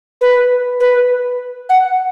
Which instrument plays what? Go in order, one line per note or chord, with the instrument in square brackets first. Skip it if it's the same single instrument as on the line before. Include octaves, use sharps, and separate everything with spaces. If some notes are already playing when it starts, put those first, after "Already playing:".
[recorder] B4
B4
F#5